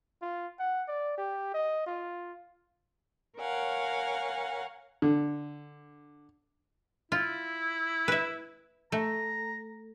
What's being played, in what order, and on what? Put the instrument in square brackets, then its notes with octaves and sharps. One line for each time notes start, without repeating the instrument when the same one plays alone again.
[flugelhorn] F4
F#5
D5
G4
D#5
F4
[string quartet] A#4 C#5 F5 F#5 G#5
[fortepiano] D3
[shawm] E4 [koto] F4
[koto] B4 E5
[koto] A3 [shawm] A#5